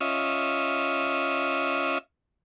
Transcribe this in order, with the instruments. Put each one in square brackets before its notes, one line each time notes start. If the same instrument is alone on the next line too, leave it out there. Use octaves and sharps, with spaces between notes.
[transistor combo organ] C#4 F4 D#5 E5